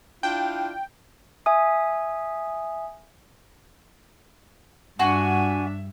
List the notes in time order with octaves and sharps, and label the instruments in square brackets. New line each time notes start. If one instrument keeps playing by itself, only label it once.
[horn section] D4 E4 F4 [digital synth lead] G5
[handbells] E5 G#5 D#6
[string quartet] G2 E5 [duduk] D4 [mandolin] F#4 [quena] G#5